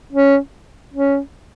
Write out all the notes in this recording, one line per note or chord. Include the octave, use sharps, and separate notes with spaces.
C#4
C#4